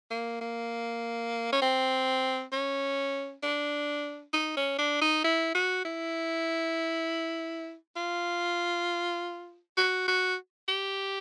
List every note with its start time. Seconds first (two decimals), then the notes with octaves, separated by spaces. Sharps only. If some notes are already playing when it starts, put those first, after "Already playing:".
0.10 A#3
0.41 A#3
1.52 C#4
1.61 C4
2.52 C#4
3.43 D4
4.33 D#4
4.57 C#4
4.78 D4
5.01 D#4
5.24 E4
5.54 F#4
5.85 E4
7.96 F4
9.77 F#4
10.08 F#4
10.68 G4